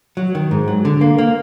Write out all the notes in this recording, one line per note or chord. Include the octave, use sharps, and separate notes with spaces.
F#3
D#3
G#2
F#3
D3
A#3
A#3